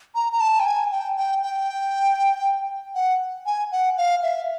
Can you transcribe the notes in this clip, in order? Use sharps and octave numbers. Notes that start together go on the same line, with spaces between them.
A#5
A#5
A5
G5
G#5
G5
G5
G5
F#5
G#5
F#5
F5
E5